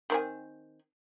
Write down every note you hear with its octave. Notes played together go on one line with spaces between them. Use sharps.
D#3 C4 G#5